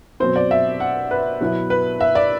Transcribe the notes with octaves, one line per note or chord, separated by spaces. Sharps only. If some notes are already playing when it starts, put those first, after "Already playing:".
B2 F#3 C4 C5
D5
E5
F#5
B4
B2 F#3 B3 E4
B4
E5
D5